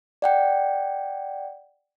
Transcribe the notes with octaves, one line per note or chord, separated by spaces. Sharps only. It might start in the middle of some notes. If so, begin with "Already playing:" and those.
D5 F#5 G5